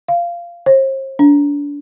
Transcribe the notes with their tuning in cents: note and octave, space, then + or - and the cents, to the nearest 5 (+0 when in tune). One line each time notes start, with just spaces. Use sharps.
F5 -15
C5 +40
D4 -30